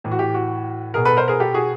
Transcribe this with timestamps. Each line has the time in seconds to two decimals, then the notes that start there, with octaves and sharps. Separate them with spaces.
0.04 A2 E3
0.11 F#4
0.19 G4
0.34 F#4
0.94 B2 G#4 A#4
1.05 A4 B4
1.17 A#4 C5
1.28 G#4 A#4
1.40 G4 A4
1.54 F#4 G#4